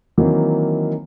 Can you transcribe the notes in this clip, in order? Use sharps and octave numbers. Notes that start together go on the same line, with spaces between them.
D#3 E3 F#3 A#3 C4